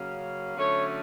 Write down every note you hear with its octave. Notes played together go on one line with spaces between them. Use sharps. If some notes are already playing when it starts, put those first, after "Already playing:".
Already playing: C#3 F#3 A#3 C#4
D3 F#3 A3 C#4 C#5